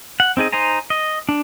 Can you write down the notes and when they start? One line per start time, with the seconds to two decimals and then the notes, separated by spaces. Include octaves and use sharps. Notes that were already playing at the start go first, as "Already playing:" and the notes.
0.20 F#5
0.37 C4 D#4 G#4 D#5
0.52 D#4 C5 G#5 A#5
0.90 D#5
1.29 D4